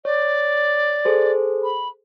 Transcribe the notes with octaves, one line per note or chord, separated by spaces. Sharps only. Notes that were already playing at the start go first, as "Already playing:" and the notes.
C#5 D5
G#4 A4 C5
B5